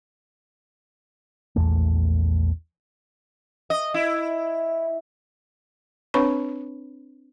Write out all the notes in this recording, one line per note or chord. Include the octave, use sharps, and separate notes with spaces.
A#1 E2 A3
D#5
E4
C4 D4 B4 C#5 B5 C#6